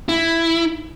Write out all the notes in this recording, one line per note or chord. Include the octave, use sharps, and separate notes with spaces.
E4